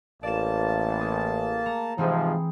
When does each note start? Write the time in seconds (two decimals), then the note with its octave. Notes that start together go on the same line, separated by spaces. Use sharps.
0.23 A1 A#3 D5 A5 E7
1.01 G#4
1.66 A3 A#5
1.98 G#2 C3 E3 F3 C4 G#4